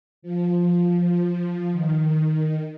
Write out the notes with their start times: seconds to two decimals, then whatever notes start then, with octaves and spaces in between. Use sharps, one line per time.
0.22 F3
1.72 D#3